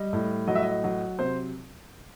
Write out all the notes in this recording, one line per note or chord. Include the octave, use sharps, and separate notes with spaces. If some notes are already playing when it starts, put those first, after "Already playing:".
Already playing: G3 D#5
A2
F#3 D#5
E5
D#5
F#3
C3 C5